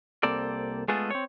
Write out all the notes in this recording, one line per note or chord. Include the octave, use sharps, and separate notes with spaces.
C2 A#3 C4 A4 D5
G#3 A3 B3 F4 G#4 A4
C4 C#5